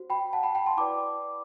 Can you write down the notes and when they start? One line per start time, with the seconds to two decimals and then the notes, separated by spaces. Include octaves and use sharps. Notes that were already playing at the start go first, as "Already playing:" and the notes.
Already playing: F#4 C5
0.10 G5 B5
0.33 F#5 A5
0.43 G5 B5
0.55 G5 B5
0.66 A5 C6
0.77 E4 B4 D5 B5 D6